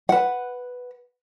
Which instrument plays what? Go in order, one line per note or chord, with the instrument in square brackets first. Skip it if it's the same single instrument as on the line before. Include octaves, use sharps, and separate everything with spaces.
[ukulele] B4 F#5